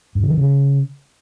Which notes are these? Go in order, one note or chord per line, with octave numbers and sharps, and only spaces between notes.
G2
D3
E3
C#3